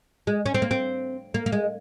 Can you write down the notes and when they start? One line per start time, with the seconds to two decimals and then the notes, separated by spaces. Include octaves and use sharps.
0.27 G#3
0.46 C#4
0.54 C4
0.62 A#3
0.71 C4
1.34 A#3
1.46 A#3
1.52 G#3